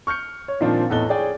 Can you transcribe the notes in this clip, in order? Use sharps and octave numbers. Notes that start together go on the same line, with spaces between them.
C#6 F6 G6 C#7
C#5
A#2 D#3 F3 C4 D4 F4
E2 A2 A4 D#5 F#6 G7
G#4 C#5 D5 G5 G#5